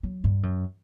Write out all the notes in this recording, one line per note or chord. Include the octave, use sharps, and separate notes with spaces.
F#3
G2
F#2